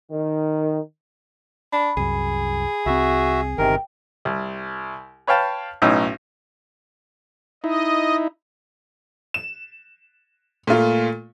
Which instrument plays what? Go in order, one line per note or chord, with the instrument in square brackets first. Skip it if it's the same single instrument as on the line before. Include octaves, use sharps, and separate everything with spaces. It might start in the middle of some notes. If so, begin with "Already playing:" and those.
[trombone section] D#3
[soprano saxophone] D4 [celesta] B5
[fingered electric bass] C2 F#2 [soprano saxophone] G#4
[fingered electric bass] C2 C4 [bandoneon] F#4 E5
[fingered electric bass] G1 [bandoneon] C3 D#3 A#4 [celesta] G5
[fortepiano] C2
B4 C#5 F5 G5 A5
B1 A2 C#4 D#4 E6
[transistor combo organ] D#4 E4 [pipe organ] D#5
[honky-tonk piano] E7
A#2 A3 F4